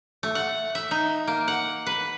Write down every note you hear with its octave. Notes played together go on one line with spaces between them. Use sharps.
A3
F#5
E5
D#4
A#3
F#5
B4